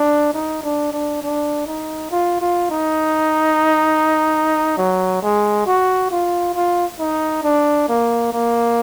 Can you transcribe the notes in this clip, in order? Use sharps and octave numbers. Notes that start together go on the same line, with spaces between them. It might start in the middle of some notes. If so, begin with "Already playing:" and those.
Already playing: D4
D#4
D4
D4
D4
D#4
F4
F4
D#4
F#3
G#3
F#4
F4
F4
D#4
D4
A#3
A#3